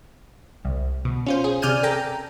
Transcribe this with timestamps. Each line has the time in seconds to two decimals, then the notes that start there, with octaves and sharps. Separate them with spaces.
0.65 C2
1.05 B2
1.26 C#4 F4 C5
1.44 G#4
1.62 C3 D5 G#5 F6 G6 D#7
1.83 A4 G5 A#5